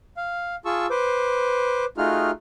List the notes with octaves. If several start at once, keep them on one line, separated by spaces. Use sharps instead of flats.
F5
F4 G#4 A5 C#6 E6
B4 C5 D6
A3 D#4 F4 F#4 G#4 F6